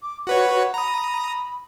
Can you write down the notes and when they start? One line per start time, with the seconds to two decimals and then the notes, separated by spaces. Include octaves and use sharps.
0.02 D6
0.27 F#4 B4 C#5 F#5
0.74 A#5 B5 D#6